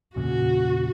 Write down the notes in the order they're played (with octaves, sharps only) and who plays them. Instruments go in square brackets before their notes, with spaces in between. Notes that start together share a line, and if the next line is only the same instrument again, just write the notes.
[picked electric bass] E2 A#2 C#3 [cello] F#4